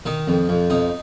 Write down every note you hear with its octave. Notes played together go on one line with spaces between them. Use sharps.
D#3 D#4
F2
F2
F2 D#4